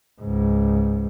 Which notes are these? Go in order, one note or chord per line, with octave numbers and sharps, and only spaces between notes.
C#2 G#2